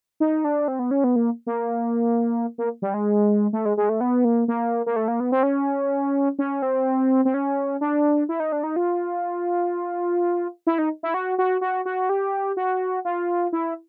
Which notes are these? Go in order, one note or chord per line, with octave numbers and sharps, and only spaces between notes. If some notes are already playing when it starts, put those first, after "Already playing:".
D#4
D4
C4
B3
C#4
B3
A#3
A#3
A#3
G3
G#3
A3
G#3
G#3
A3
B3
A#3
A#3
A#3
A3
A#3
B3
C4
C#4
C#4
C4
C4
C#4
D4
E4
D#4
D4
D#4
F4
E4
D#4
E4
F#4
F#4
F#4
F#4
G4
F#4
F4
E4